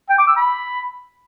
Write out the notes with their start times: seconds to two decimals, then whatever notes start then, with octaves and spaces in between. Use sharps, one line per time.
0.10 G5
0.18 D6
0.27 E6
0.36 B5